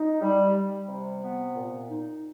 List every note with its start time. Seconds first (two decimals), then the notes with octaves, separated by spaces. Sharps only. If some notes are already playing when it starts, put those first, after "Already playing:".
Already playing: D#4
0.22 G3
0.54 G3
0.88 C3
1.22 B3
1.55 A#2
1.89 D#4